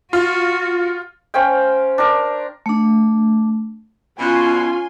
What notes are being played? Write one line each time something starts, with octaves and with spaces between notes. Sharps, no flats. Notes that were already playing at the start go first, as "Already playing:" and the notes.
F4 F#4
C#4 C5 F5 G5
D4 A#4
A3 D4
B2 C#4 F4 G#5 C6